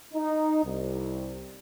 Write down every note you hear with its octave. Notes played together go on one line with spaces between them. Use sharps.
D#4
C2